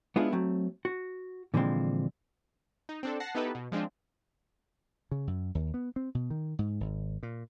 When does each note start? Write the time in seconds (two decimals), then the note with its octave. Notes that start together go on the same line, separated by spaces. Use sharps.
0.16 G#3 B3 D4 E4 F4 G#4
0.32 F#3 A3 C4
0.85 F#4
1.54 A#2 D3 E3 F3 G#3 C4
2.89 D#4
3.03 C4 D4 A4
3.20 F#5 A5 A#6 C7
3.35 B3 D#4 E4 G4 A4 B4
3.55 B2
3.72 F3 G#3 C4 D4 F4
5.11 C#3
5.27 F#2
5.55 D#2
5.74 B3
5.96 C4
6.15 B2
6.30 D#3
6.59 G#2
6.80 G#1
7.23 A#2